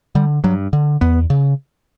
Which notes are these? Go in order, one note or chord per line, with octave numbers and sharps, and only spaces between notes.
D3 G3
G2 F#3
D3
E2 B3
C#3